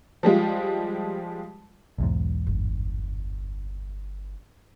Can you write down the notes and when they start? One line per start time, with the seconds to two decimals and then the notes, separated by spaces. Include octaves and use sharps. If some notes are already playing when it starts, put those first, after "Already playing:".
0.23 F3 G3 G#3 F4
1.98 B1 E2 G#2
2.47 G1